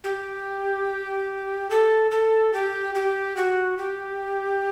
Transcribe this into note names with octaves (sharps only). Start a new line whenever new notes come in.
G4
A4
A4
G4
G4
F#4
G4